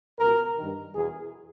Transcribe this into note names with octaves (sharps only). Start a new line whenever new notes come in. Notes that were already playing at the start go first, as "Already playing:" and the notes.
C#2 B2 A#4
G2 D#3
E2 B2 G#4